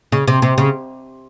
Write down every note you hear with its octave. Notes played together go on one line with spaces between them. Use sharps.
C#3
C3
C3
C#3